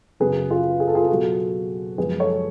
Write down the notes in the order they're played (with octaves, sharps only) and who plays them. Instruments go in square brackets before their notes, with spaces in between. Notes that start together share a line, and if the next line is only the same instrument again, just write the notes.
[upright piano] F#2 C#3 F#3 G#4 B4
F4 G#4
G#4
A4
F4 G#4
B2 F#3 F#4 A4
F#2 F3 G#3 G#4 B4
A4 C#5